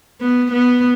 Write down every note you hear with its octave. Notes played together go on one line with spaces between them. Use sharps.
B3
B3